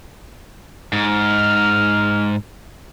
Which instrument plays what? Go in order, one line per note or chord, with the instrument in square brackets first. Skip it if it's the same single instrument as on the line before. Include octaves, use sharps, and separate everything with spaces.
[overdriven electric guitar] G#2 [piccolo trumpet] F6